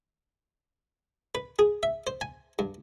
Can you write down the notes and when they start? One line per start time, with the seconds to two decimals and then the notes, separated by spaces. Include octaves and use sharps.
1.35 B4
1.59 G#4
1.83 E5
2.07 C5
2.21 G#5
2.59 G2